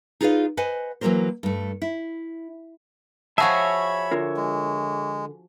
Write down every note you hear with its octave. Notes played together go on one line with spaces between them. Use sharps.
D#4 F4 G#4 B4 D5 F5
B4 C5 D#5 F#5 G#5
E3 F#3 A#3 E4 A#4 C5
G2 A3
E4
F3 F#4 G#4 C#5 E5 F5 A5 B5
D3 F4 A#4
G#3